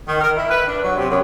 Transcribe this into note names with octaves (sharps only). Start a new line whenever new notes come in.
D#3
A#4
E4
B4
D4
F#3
C3
F#2